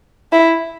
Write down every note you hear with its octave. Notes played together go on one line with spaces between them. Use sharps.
E4